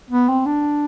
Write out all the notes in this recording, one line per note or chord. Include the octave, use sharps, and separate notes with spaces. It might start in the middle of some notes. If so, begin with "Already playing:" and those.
B3
C4
D4